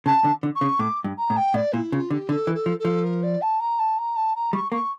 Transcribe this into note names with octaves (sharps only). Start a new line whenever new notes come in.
C#3 A5
D3
D3
C#6
C#3
A2 D6
G2
A#5
A2
G5
A2 D5
A#2 E4
C#3 F4
D3 G4
D3 A4
E3
A4
F3
A4
F3
A#4
D5
A5
A#5
A5
A#5
A5
A#5
G3 C#6
A#3 C#6